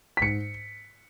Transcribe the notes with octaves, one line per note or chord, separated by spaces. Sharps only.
B6
G#2 C#7